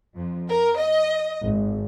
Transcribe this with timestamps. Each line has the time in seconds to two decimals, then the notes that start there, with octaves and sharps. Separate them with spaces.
0.16 F2
0.50 A#4
0.79 D#5
1.44 G#1